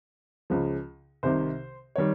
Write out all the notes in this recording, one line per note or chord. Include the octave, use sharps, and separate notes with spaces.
C#2 C#3 F3
C2 C3 D#3 C5
D#3 G3 C#5